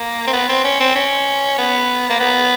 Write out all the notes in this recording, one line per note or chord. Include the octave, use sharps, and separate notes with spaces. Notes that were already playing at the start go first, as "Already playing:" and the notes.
Already playing: A#3
C4
B3
C4
C#4
C4
C#4
B3
A#3
B3